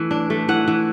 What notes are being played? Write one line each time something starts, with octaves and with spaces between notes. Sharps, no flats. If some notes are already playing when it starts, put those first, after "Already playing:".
Already playing: E3 A3
D4
A3
E3 F#5
E3